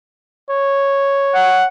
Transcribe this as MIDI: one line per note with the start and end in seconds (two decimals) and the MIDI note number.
0.50 1.67 73
1.34 1.65 78